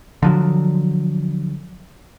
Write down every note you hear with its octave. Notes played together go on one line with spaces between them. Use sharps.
D3 F3 F#3